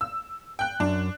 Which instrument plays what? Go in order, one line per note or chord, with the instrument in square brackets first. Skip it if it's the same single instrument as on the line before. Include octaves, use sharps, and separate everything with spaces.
[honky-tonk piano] E6
G5 F#6
[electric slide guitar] F#2 [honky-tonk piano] D4